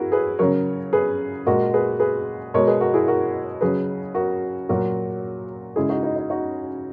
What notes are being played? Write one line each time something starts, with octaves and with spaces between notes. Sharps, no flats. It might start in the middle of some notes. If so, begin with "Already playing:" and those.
Already playing: E4 F#4 G#4 A#4
G#4 B4
C#3 F#3 A#4 C#5
G#4 B4
A#2 G#3 F#4 A#4
G#4 B4
G#4 B4
B2 G#3 A#4 C#5
G#4 B4
F#4 A#4
E4 G#4
F#4 A#4
C#3 F#3 G#4 B4
F#4 A#4
A#2 F#3 F#4 A#4
C#3 G#3 E4 G#4
D#4 F#4
D#4
D#4
D#4 F#4